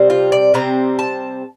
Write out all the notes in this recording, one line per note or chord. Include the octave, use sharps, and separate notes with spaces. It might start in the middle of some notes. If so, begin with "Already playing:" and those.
Already playing: C3 G3 C4
F4
D5
C3 G3 C4 A#5
A5